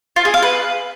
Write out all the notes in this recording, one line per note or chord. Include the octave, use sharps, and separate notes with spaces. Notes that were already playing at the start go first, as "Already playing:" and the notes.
F4
G#4
F5
B4